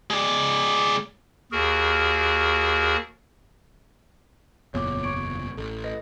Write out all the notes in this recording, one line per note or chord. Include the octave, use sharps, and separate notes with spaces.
G#3 D5
D#2 F#4 G#4 A#4
F#1 E2 A#2 C#5 D6
C#6 G#6 D7
A1 A4
B4 D#5 A#6